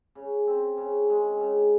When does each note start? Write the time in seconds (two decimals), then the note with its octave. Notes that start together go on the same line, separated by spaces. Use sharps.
0.15 C#3
0.47 C4
0.78 C#3
1.10 G#3
1.40 C#3